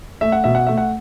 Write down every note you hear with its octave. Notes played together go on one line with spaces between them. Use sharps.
A3 E5
F#5
B2 E5
F#5
A3 E5
F#5